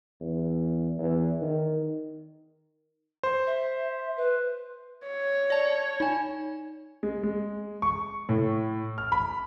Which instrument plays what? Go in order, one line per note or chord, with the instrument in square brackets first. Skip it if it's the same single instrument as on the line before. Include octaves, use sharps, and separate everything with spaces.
[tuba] E2
E2
D#3
[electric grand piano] C5
[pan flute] E5
B4
[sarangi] C#5
[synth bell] D5 A5
D#4 G#5
[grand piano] G#3
G#3
C#6
A2
F6
B5